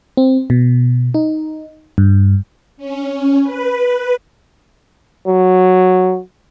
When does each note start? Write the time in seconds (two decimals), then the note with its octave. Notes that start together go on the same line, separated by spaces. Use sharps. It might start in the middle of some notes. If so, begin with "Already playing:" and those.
0.17 C4
0.50 B2
1.14 D#4
1.98 G2
2.77 C#4
3.43 B4
5.27 F#3